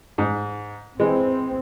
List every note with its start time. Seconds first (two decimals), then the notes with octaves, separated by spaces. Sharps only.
0.18 G#2
0.99 E3 G#3 C4